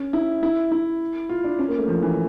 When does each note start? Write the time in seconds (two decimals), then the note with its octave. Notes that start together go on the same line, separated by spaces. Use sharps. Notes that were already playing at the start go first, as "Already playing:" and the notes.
Already playing: C#4
0.13 E4
0.43 E4
0.72 E4
1.29 F4
1.44 D4
1.59 C#4
1.68 A#3
1.78 A3
1.88 F3
2.02 E3